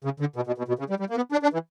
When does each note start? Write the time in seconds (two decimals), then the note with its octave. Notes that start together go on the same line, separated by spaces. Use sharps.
0.04 C#3
0.20 D3
0.36 B2
0.47 B2
0.58 B2
0.68 B2
0.79 C#3
0.90 G3
1.00 G3
1.10 A#3
1.16 B3
1.32 D4
1.43 D4
1.53 E3